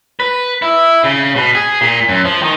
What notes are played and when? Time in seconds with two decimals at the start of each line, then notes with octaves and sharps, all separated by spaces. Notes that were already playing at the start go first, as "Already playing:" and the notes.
0.20 B4
0.62 E4
1.04 C#3
1.36 B2
1.55 G#4
1.81 A#2
2.09 F#2
2.25 F3
2.43 D#3